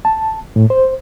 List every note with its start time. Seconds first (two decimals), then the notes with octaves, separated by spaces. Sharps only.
0.05 A5
0.56 A2
0.70 C5